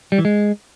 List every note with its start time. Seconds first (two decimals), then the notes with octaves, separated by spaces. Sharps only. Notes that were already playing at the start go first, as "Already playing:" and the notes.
0.12 G3
0.18 E3
0.25 G#3